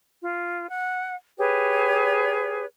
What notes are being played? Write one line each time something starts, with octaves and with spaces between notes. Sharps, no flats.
F4
F#5
G4 G#4 B4 C#5